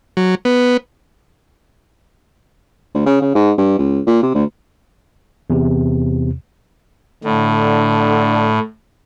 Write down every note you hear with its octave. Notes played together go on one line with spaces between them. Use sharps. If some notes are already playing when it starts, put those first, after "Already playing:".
F#3
B3
D2
C#3
C#3
G#2
G2
C#2
A#2
C3
D2
E2 C3
A2 D3